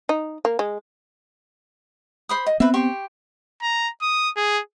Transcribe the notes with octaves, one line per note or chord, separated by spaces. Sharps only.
D#4
A#3
G#3
C5 B5 D#6
D#5
B3 C4 B4 E5
G4 C6 C#6
A#5
D#6
G#4